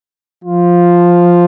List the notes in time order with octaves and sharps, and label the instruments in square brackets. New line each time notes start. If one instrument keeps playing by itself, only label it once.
[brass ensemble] F3 F4